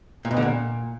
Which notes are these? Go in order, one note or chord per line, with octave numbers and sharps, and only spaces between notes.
A#2
B2
D3
A#2